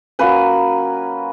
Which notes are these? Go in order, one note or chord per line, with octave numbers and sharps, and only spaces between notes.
F#3 A#3 C#4 B4